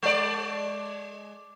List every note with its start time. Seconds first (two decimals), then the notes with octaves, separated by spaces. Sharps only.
0.03 G#3 D5